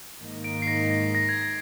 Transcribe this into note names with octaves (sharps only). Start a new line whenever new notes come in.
G#2 D#3 A#3 D#4
D7
C7
A#6
A#6
A#6
G#6
A#6